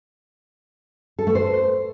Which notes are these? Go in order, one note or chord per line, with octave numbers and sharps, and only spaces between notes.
A4
A3
C5